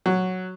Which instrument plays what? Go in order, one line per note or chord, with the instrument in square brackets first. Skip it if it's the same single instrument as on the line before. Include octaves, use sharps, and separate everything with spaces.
[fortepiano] F#3